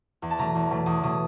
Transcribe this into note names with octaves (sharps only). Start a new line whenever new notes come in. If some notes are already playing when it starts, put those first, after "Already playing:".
E2
A5
B2 F#3 A3 A#5
E2
B2 F#3 A3
E2 D#6
B2 F#3 A3 D#6